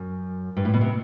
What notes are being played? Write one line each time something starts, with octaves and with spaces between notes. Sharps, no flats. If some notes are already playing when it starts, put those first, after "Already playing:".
Already playing: F#2
G2
A2
B2
C3